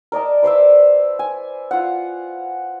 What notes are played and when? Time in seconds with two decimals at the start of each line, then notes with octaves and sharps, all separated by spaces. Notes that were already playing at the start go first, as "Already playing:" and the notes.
0.12 A#4 D5 D#5 A5
0.43 B4 C5 D5 E5
1.19 G#5
1.71 F4 F#5